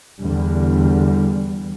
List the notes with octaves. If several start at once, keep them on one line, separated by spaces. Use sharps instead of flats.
E2 D3 G3